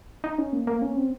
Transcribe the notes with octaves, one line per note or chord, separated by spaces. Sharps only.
D#4
C#4
A#3
A#3
C#4
C4